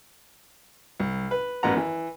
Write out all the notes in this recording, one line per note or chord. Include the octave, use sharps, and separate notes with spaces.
C2
B4
A1 F#2 B3 F#5 A#5
E3